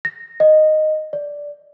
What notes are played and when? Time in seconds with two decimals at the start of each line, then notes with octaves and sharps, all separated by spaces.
0.05 A#6
0.40 D#5
1.13 D5